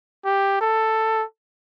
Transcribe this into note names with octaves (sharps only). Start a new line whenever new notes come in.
G4
A4